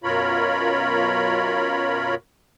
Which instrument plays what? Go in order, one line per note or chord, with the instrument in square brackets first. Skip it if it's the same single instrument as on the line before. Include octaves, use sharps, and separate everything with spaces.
[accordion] F#2 B2 F4 A#4 C#5 B5